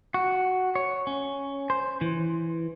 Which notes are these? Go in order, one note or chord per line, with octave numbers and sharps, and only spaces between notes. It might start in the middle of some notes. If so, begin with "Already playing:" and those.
F#4
C#5
C#4
C5
E3